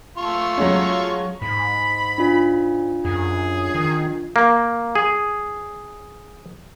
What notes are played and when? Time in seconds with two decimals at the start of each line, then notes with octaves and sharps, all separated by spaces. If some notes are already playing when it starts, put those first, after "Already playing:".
0.17 A3 F4 C#6
0.58 F#3 G#3 C#4
1.42 G#2 B5
2.18 D4 F4
3.05 F#2 G#4
3.75 D#3
4.36 A#3
4.95 G#4